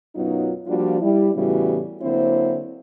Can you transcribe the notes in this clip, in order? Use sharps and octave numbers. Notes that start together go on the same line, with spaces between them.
F#2 B2 F#3 B3 D#4 F4
F3 G3 A#3 D4 F4 F#4
G3 E4
A2 C#3 E3 G3 B3 F#4
D3 F#3 A#3 C4 E4 C5